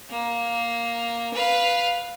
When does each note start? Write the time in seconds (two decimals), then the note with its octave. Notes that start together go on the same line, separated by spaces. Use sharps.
0.10 A#3
1.33 B4 F5